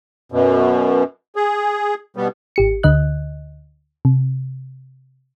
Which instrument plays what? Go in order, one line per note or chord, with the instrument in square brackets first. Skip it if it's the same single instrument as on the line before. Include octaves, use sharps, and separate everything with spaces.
[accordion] F#2 B2
G#4
B2 G3 B3
[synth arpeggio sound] G#1 G4 C#7
D2 D3 D#5 F#6
C3